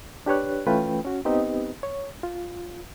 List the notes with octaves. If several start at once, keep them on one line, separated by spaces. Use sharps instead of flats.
D4 G4 B4 C#5 F#6
E3 A3 C#4 F4 B4 G5
C#4 F#4
B3 C4 D#4 G4 B4 D#5
C#5
F4